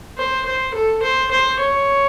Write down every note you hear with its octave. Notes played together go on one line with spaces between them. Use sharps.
C5
C5
A4
C5
C5
C#5